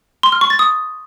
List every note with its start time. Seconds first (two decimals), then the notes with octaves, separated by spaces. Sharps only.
0.23 C6
0.32 F6
0.41 C#6
0.50 A6
0.59 D#6